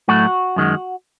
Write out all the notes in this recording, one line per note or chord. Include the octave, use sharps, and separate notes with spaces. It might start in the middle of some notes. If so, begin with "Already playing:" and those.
A2 F#3 A3 F#4
F#2 D#3 G#3